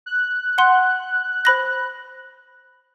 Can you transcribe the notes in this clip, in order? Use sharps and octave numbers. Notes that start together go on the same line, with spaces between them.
F#6
F#5 C6
C5 B5 A#6